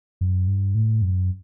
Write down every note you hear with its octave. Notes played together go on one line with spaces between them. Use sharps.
F#2
G2
A2
F#2